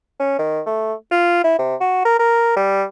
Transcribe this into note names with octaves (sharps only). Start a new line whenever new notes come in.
C#4
D#3
A3
F4
E4
C3
F#4
A#4
A#4
G3